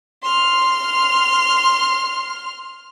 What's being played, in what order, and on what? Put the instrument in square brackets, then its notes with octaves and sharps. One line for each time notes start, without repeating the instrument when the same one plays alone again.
[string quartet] C6 F6